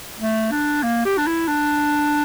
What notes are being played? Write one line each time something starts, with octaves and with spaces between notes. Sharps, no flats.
A3
D4
A#3
G4
D4
E4
D4